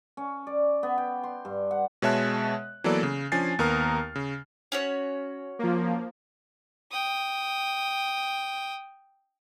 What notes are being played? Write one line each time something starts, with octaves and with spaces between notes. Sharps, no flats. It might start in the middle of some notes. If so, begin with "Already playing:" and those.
C#4
D5
B3
G5
C6
G2
F#5
B2 G#3 C#5 E5 A5 F#6
E3 F#3 A#3 B3 A4 D5
C#3
F3 C#4 D4 G#5 A6 C7
D#2 B3 A#4 A#5 D#6 F6
C#3
C#4 F#4 C#5
F3 A#3
G5 D#6